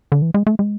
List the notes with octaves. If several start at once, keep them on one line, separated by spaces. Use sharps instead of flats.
D3
E3
G#3
A3
G#3